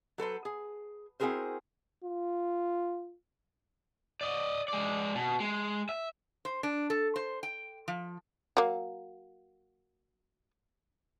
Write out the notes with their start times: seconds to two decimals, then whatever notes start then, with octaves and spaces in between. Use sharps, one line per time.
0.18 F#3 A4 B4 C5
0.45 G#4
1.20 C4 E4 F#4 G#4 A#4 C5
2.04 F4
4.21 D5 D#5
4.68 G#3 D5
5.15 B2
5.40 G#3
5.89 E5
6.45 C5
6.63 D4
6.90 A4
7.16 C5
7.43 G5
7.88 F3
8.57 F#3 A#3